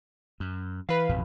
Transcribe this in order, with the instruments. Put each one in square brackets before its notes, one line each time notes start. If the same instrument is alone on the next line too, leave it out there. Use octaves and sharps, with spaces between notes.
[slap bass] F#2
[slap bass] E3 [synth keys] B4 F5
[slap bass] A1 F2 B2